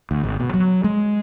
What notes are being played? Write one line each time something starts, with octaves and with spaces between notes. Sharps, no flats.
D2
G#1
B2
F#3
G#3